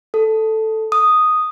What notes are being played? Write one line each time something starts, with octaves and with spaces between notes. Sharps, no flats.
A4
D#6